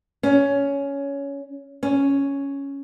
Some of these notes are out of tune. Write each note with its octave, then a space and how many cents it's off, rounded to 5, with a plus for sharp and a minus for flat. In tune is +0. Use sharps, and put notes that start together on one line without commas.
C#4 +15
C#4 +0